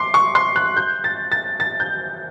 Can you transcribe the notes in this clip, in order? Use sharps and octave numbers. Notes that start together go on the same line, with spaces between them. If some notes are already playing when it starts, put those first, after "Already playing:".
Already playing: C6 D6
C#6
C6
F#6
G6
A6
A6
A6
G6